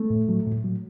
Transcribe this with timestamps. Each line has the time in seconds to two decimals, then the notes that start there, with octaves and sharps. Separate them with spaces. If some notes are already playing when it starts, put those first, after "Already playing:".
Already playing: A3
0.10 A2
0.29 F#3
0.46 A2
0.65 F#3